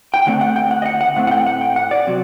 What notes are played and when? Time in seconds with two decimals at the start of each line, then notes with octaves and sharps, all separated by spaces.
0.14 G5
0.26 D2 D3 A3 C4 F#5
0.41 F#5
0.56 G5
0.71 F#5
0.82 D#5
0.86 F#5
1.01 F#5
1.16 A2 A3 C4 F#5
1.27 F#5
1.31 G5
1.47 F#5
1.61 G5
1.76 F#5
1.91 D5
2.07 C3 F#3